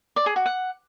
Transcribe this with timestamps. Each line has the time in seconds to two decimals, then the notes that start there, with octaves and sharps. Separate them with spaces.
0.16 D5
0.26 G#4
0.36 F#4
0.46 F#5